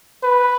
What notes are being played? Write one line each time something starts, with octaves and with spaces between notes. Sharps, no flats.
B4